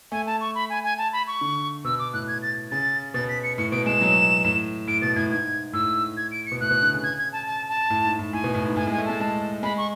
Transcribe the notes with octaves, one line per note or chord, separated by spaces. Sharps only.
A3 G#5
A5
C#6
B5
G#5
G#5
A5
B5
C#6
D3
B2 E6
D6
A2 F#6
G#6
A6
C#3 A6
B2 A6
B6
C#7
A2 C#7
B2 D7
G#3 E7
F#3
A2
A2 D7
B2 A6
A2 G#6
G#2 G#6
A2 E6
G#6
D7
C#7
B2
A2 F#6
B2
D3
C#3
G#6
G#6
A5
A5
A5
A2
G#2
A2
A2 G#5
B2
A2
G#2
A2 G#5
G#3 G#5
A3
G#3 A5
G#3
G#3 B5
C#6